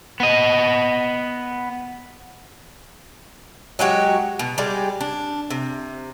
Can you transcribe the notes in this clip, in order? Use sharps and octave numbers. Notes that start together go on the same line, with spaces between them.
B3 D#5
F#3 G#3 F#4 G4
B2
G3 G#3 G4 D5
D4
C3